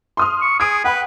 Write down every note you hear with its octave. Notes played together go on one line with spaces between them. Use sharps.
C6 D#6 F6
C#6
G#4 D#6 D7
B4 F#5 G5 B5